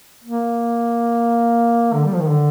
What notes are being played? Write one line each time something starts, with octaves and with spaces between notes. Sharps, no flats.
A#3
D3
G3
F3
D#3
D3